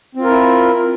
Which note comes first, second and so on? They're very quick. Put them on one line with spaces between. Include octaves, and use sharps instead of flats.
C4 F4 A#4 E4